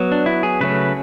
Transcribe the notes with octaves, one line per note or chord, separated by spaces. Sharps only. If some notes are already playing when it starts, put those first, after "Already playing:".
Already playing: F#3 B3
D4
E4
G#4
C#3 F#3 A3 C#4 B4